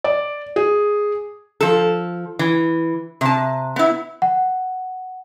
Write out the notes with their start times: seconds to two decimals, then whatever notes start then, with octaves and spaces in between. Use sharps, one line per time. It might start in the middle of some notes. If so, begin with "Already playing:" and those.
0.04 D5
0.56 G#4
1.61 F3 A4
2.39 E3
3.21 C3 A5
3.76 B3 E4
4.22 F#5